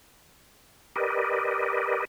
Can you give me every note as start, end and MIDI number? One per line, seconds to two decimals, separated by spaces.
0.96 2.05 67
0.96 2.05 70
0.96 2.05 71
0.96 2.05 74
0.96 2.05 75